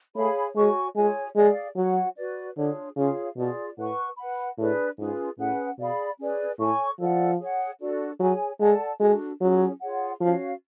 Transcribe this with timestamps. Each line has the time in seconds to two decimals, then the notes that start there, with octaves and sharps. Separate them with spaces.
0.15 A3 G#4 C#5 F5 B5
0.55 G#3 F#4 C#5 G#5 C#6
0.96 G#3 F4 G#4 C#5 G#5
1.36 G#3 G#4 D5 F5
1.76 F#3 F#4 C#5 F#5
2.16 F#4 B4 D5
2.57 D3 D4 F4 G#4 C#5
2.96 C#3 F4 G#4 C#5 F5
3.37 B2 F4 G#4 D5
3.77 A2 B4 F#5 C#6
4.17 B4 F#5 B5
4.58 A2 D4 G#4 B4 D5
4.98 G#2 C#4 F4 G#4 B4
5.37 A2 C#4 G#4 B4 F#5
5.78 B2 G#4 D5 F5 B5
6.19 C#4 G#4 B4 D5
6.58 A2 A4 C#5 G#5 C#6
6.99 F3 A4 D5 F#5
7.39 G#4 C#5 F#5
7.79 D4 F#4 A4 D5
8.19 F#3 G#4 C#5 G#5
8.60 G#3 A4 D5 F#5 A5
9.00 G#3 D4 F#4 A4
9.40 F#3 C#4 F4 G#4 C#5
9.80 F4 G#4 C#5 F#5
10.20 F3 C#4 F#4 C#5 F5